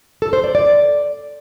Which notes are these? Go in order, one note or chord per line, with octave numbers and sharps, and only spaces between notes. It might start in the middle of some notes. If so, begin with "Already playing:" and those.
A4
C5
D5
D5